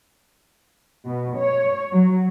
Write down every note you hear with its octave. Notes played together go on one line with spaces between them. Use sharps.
B2
C#5
F#3